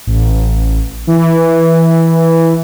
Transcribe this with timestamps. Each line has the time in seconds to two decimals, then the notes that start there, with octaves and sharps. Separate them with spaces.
0.07 A1
1.07 E3